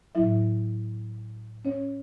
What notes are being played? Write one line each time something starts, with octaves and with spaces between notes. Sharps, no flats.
A2 F#3 E4 E5
C#4 C#5